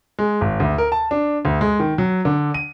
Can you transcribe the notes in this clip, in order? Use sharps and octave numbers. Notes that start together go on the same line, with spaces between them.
G#3
G#1
D2
A#4
A5
D4
D2
G#3
D#3
F#3
D3
D#7